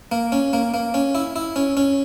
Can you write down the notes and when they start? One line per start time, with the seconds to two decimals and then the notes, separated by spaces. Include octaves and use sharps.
0.12 A#3
0.32 C#4
0.53 A#3
0.74 A#3
0.94 C#4
1.15 E4
1.36 E4
1.56 C#4
1.77 C#4